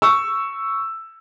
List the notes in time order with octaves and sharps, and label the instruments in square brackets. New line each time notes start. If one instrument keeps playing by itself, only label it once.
[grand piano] C#6 E6